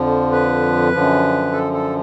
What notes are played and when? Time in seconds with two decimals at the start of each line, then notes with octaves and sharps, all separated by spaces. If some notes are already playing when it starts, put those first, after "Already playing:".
Already playing: F2 D3 F3
0.32 B4
0.92 F#2 D3 F3
1.53 A4
1.73 A4